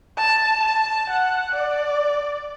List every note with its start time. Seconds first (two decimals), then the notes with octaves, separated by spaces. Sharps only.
0.17 A5
0.63 A5
1.10 F#5
1.55 D5